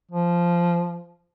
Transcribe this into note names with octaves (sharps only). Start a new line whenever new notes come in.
F3